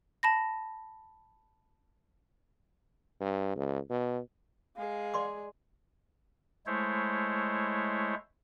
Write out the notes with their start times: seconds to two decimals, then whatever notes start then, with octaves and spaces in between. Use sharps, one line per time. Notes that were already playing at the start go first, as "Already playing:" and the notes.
0.23 A5 B5 A#6
3.21 G2
3.56 C#2
3.90 B2
4.76 G#3 G#4 F5
5.14 D5 C6 D6
6.66 G#3 A3 E4 C5 C#5